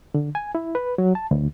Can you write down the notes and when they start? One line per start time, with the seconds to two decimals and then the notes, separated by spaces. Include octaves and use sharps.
0.14 D3
0.35 G#5
0.55 E4
0.75 B4
0.98 F#3
1.15 A5
1.31 D2